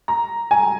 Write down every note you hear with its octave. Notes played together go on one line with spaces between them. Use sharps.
A#5
G#5